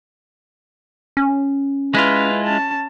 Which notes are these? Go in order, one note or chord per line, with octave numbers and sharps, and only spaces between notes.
C#4
G#3 E4 F4 B4
C#4 A5